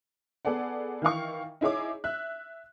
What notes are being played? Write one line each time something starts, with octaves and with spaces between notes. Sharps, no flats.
B3 G#4 A4 D5 F#5
D#3 E3 F5 C#6
D#4 E4 G#4 C#5 D6
E5 F#6